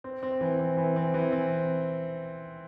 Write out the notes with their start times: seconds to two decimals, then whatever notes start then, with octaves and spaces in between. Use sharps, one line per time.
0.04 C4
0.23 C4
0.41 E3
0.59 C4
0.77 E3
0.96 C4
1.14 E3
1.32 C4